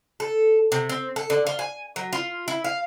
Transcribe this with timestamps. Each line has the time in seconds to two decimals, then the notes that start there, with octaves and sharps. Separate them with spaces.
0.20 A4
0.72 C3
0.89 C4
1.16 A4
1.30 D3
1.47 F4
1.59 G#5
1.96 F#3
2.13 F4
2.48 E4
2.64 F5